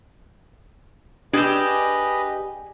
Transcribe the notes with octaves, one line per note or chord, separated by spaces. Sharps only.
D4 G4 G#4 B4 D#5 E6